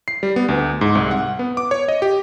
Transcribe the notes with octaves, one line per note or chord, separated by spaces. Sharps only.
C7
G3
B3
D2
G#2
C2
F#5
B3
D6
C#5
D#5
G4